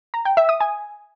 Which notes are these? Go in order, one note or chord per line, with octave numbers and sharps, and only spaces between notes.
A#5
G5
E5
D#6
G#5